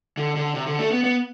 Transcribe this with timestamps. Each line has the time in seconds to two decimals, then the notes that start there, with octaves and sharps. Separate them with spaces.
0.17 D3
0.36 D3
0.55 C3
0.66 D3
0.79 A3
0.91 B3
1.04 B3